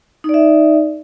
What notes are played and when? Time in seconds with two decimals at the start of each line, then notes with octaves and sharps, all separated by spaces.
0.24 D#4
0.29 D5
0.34 E5